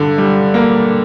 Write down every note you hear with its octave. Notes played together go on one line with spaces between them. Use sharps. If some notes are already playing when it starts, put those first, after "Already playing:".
Already playing: G2 D3
G3
A#3